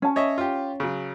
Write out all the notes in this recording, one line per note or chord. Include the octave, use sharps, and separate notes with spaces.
C#4 A5
C#5 D#5 E5
F4 G4
C#3 F#3